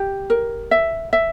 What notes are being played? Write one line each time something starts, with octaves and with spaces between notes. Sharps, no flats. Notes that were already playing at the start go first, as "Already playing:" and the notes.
Already playing: G4
A#4
E5
E5